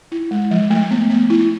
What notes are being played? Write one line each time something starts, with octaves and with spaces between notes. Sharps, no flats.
E4
G#3
F3
A3
B3
B3
E4